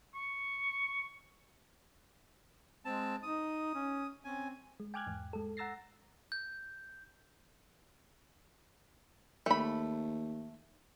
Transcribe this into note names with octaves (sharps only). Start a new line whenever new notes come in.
C#6
G#3 C4 A5
D#4 D#6
C#4
C4 C#4 G#5
G#3
G5 G#5 D6 F6 F#6 G#6
E2 G#2
G#3 A4
F#5 A#5 E6 A6 A#6 C7
G6
D#2 A3 B5